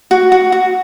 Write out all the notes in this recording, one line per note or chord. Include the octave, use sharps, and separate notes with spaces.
F#4
F#4
F#4